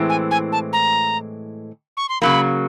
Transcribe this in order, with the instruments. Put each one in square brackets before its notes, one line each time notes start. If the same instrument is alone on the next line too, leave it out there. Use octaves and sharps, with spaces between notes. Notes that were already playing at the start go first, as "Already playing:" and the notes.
Already playing: [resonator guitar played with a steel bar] A2 E3 G#3 C4
[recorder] G#5
G#5
A5
A#5
C#6
C6
[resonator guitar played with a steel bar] C#3 F#3 A#3 [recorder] B5